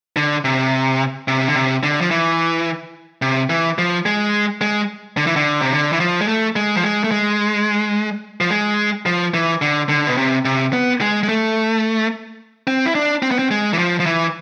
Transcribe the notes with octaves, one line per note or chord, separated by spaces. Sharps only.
D3
C3
C3
D3
C3
D3
F3
E3
C3
E3
F3
G#3
G#3
D3
E3
D3
C3
D3
E3
F3
G#3
A3
G#3
F3
G#3
A3
G#3
F3
G#3
F3
E3
D3
D3
B2
C3
C3
B3
G#3
G#3
A3
C4
E4
D4
C4
B3
C4
G#3
E3
F3
F3
E3